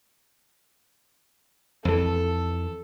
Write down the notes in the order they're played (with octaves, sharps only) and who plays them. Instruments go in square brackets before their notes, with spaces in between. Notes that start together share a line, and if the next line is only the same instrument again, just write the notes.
[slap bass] F2 E3 [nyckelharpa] A4